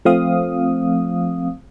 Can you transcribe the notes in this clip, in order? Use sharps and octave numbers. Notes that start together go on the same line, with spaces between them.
F3 A3 C4 F5 D#6